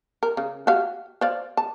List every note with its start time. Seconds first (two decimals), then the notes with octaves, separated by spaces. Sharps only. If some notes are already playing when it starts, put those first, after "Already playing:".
0.23 A#4
0.37 C#3
0.67 F#4 G4 F5
1.21 C5 D5 F5
1.57 A5